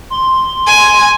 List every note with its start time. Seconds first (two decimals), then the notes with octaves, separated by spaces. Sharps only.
0.10 C6
0.67 G#5